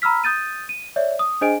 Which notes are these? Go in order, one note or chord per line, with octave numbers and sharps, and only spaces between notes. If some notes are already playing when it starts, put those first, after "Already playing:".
A#5 B5 E6 F6 B6
D#6 G6 A6 D#7
D#7
C#5 D5 E5
D#6
D4 G#4 C5 D#5 G#5 D7